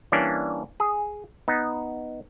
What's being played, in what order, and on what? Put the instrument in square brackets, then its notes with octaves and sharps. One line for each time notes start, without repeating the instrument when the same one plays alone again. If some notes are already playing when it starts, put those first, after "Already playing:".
[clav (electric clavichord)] E3 G3 A#3 C#4 D4
G#4
B3 D#4